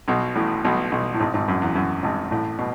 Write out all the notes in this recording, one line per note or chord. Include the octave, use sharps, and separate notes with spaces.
B1 B2
A1 A2
B1 B2
B1 B2
A2
G#1 G#2
G#1 G#2
F#2
E2
F#2
G#1 G#2
A1 A2
B2